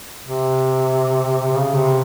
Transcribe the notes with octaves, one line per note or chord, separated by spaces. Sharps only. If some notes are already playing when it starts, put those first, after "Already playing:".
C3
C#3
C3